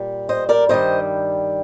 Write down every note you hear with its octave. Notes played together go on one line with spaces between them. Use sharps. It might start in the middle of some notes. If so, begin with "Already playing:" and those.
Already playing: A#2 G3
C5 D#5
A#4 D5
G2 D#3 G3 C5 D#5